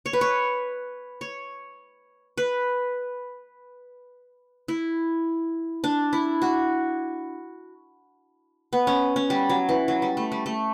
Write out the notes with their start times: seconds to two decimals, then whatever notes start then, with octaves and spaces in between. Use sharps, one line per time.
0.06 C#5
0.13 B4
0.21 C#5
1.21 C#5
2.37 B4
4.68 E4
5.84 D4
6.13 E4
6.42 F#4
8.73 B3
8.87 C#4
9.16 C#4
9.30 G3
9.50 F#3
9.69 E3
9.88 F#3
10.02 G3
10.17 A3
10.32 G3
10.46 A3